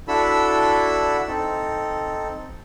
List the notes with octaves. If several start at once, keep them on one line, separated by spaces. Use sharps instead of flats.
D4 E4 F#4 A4 B5 E6
C4 D#4 A4